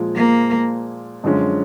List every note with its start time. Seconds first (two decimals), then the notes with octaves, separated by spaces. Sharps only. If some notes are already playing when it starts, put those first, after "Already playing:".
Already playing: A#2 F3 G#3
0.15 A#3
1.24 F#2 D3 F3 G#3 C#4